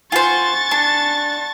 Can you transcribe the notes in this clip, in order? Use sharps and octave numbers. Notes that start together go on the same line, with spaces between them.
F4 C5 F#5 G#5 C#6 A6
D4 A5